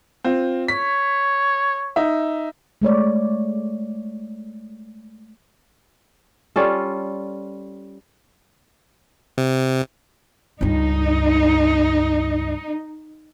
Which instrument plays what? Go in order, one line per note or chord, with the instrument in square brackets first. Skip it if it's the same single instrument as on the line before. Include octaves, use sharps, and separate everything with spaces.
[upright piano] C4 F4
[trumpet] C#5 [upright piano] B6
[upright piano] D#4 E5
[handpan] G#3 A3 C#5 D5
[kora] G3 C#4 F4 A4
[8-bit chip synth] C3
[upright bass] C#2 G2 [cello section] D#4